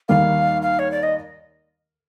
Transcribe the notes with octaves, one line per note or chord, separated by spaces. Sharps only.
D#2 D#3 G3 A#3 F5
F5
C#5
D5
D#5